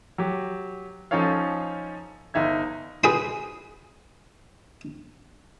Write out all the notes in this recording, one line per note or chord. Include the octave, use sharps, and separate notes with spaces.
F#3 G4
F3 C#4 D#4 A4 C#5 F5
G1 D#4 E5 G#6
G#4 B4 G5 G#5 C6